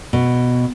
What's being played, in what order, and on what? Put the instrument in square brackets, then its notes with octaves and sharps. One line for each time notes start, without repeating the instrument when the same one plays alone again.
[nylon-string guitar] B2